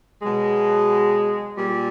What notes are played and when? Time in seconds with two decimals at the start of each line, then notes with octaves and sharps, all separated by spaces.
0.22 B2 F#3 G#3
1.58 A#2 G3